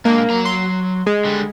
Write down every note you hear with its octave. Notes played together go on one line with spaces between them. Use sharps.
G#3 A#3 D4
F#3 A#5
C6
G#3
D3 G3